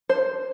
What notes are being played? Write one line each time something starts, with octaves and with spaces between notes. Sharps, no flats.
C5